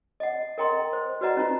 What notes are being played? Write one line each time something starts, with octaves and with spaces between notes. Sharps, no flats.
D#5 F#5
A#4 D#5 G5 A#5 C6
C5
F#4 B4 D5 D#5 F#5 A#5
C#4 D#4 F4 A#5